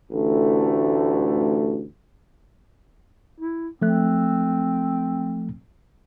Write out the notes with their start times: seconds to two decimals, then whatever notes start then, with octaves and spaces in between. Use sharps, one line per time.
0.12 A1 D2 A3
3.40 E4
3.82 F3 A3 C4 F#6